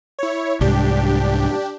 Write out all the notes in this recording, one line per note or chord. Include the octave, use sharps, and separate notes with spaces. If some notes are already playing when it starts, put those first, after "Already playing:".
E4 C#5
C2 G#2 D4 G4